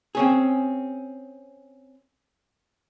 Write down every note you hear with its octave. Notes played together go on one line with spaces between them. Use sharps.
C4 C#4 G#4